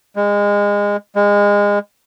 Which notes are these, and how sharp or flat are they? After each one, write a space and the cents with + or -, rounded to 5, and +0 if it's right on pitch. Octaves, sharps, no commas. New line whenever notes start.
G#3 -25
G#3 -25